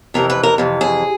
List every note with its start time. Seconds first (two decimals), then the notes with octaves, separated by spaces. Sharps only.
0.14 F2 C3 E3 A#4
0.30 B4
0.43 A#4
0.58 F2 C3 E3
0.81 G#4